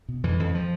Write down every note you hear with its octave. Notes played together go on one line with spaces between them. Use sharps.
B2
F2 E3
F2
F3